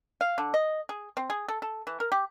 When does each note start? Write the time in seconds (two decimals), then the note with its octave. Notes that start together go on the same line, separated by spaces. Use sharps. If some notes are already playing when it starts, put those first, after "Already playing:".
0.21 F5
0.38 D3
0.54 D#5
0.89 G#4
1.17 C4
1.30 G#4
1.48 A4
1.62 A4
1.87 E3
2.00 A#4
2.12 G4